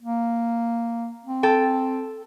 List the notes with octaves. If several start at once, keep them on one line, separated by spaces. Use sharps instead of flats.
A#3
C4
A4 G5